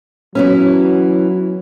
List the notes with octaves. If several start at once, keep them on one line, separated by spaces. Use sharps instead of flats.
E3 F#3 B3 C#4